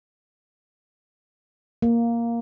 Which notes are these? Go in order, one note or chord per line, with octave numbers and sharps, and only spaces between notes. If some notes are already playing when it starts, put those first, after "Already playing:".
A#3